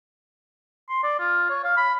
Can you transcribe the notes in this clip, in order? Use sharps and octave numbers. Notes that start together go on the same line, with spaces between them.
C6
D5
F4
C#5
F5
B5